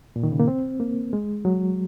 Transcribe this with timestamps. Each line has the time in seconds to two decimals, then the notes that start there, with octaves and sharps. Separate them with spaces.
0.16 A#2
0.23 D#3
0.32 C#3
0.40 A#3
0.48 C4
0.80 A#3
1.13 G#3
1.45 F#3